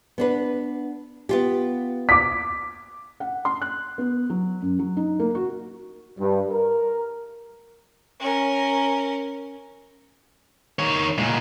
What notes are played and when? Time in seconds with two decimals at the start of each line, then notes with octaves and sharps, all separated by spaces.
0.18 B3 D4 B4
1.29 B3 F4 G4
2.09 D6 B6
3.20 F#5
3.45 C6
3.62 F#6
3.98 B3
4.30 F#3
4.62 F#2
4.79 F#3
4.97 D#4
5.20 A#3
5.35 F#4
6.19 G2
6.50 A#4
8.20 C#4 A#4
10.79 D#3 C#5
11.18 A#2 G#3